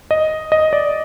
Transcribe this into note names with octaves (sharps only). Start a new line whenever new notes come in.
D#5
D#5
D5